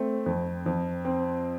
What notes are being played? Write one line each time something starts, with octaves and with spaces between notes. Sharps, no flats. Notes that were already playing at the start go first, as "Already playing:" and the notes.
Already playing: A3 C4
F2
F2
C4